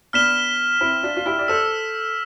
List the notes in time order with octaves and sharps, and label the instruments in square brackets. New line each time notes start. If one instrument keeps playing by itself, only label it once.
[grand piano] B3 D4 [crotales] F6 B6 E7 G7
[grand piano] C4 E4
D4 F4
F4
E4 G4
D5
[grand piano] A4 C5 [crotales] E6 B6 E7